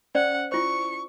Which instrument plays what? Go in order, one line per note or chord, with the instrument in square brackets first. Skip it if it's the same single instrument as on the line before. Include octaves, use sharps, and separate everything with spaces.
[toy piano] C#4 C5 D5 [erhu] F#5
[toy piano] E4 F4 C5 [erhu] C#6